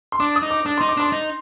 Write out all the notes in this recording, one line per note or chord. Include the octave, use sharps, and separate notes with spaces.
C6
D4 D6
D#6
D#4
D6
D4 D6
C6
D#4
D6
D4 C6
D#4